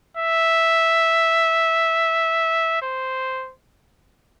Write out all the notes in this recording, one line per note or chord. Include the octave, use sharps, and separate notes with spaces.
E5
C5